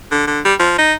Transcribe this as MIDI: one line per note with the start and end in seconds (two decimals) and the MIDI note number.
0.12 0.27 50
0.27 0.40 50
0.45 0.54 55
0.60 0.77 53
0.78 0.93 63